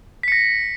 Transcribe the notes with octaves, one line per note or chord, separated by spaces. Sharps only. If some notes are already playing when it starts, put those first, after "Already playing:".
A#6 B6 C#7